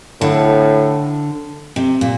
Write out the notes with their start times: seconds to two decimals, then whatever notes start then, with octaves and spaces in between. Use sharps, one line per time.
0.21 A2 D3
1.76 C3
2.01 A#2